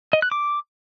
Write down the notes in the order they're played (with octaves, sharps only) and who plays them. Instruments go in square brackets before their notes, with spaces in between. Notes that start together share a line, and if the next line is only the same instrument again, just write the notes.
[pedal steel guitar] D#5
F#6
D6